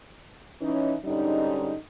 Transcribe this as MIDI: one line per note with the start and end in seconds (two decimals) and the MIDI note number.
0.62 0.95 52
0.62 0.95 61
0.62 0.95 63
1.05 1.75 44
1.05 1.75 50
1.05 1.75 55
1.05 1.75 61
1.05 1.75 63